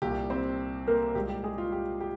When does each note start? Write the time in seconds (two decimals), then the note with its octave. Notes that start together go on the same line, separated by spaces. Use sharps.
0.02 C2 A#2 G3 G4
0.30 C4 C5
0.87 A#3 A#4
1.15 C2 A#2 G#3 G4
1.29 G4
1.44 G#3 G#4
1.58 F4
1.72 G4
2.00 G4